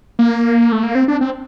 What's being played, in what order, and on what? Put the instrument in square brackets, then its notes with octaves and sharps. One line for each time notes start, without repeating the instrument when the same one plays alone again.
[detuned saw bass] A#3
A3
A#3
C4
D4
C4